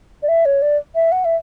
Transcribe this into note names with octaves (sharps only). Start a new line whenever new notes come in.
D5
E5
C#5
D5
E5
F#5
E5